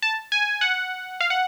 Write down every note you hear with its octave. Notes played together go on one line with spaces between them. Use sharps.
A5
G#5
F#5
F5
F#5